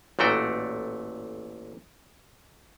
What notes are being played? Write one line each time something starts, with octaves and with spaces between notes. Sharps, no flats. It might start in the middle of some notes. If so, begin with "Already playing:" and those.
A1 A#2 A3 F#4 G5